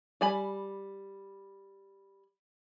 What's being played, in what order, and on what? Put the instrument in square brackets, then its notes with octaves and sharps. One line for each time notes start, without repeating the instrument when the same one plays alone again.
[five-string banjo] G3 G#5 B5